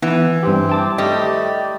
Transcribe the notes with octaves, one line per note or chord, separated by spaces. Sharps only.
E3 B3
G2 C4 G4
G5 A5 D6
G3 A3 G4 D#5